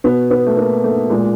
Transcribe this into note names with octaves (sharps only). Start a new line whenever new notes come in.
B2 B3
B3
A3
A#3
A3
A#2 G#3